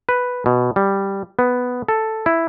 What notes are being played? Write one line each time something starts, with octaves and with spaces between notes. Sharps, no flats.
B4
B2
G3
B3
A4
E4